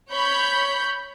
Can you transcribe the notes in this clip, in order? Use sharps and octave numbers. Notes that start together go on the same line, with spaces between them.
C#5 B5 G6